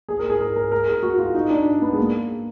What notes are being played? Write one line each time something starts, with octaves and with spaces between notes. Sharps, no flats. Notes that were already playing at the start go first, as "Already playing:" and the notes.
G#4
A#4
G#4
A#4
A#4
A#4
G#4
F#4
F4
D#4
D4
B3
G#3
A#3